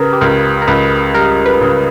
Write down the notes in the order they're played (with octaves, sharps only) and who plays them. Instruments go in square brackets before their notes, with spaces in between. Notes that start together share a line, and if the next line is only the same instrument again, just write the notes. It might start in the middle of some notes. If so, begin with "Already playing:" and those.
Already playing: [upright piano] C#3 [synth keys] G4 A#4 B4
[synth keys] G4
[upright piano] C#2 [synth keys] A#4
[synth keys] A#4
[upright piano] C#2 [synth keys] B4
[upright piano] G3 [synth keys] A#4
[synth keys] B4
[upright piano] C#3